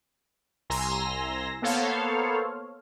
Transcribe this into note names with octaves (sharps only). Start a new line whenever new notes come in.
C2 G#5 A#5 C6 E6 A#6
A#3 B3 A4 C5 C#5 F5